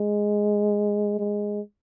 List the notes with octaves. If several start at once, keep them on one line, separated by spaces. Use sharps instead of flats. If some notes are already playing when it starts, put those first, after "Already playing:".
Already playing: G#3
G#3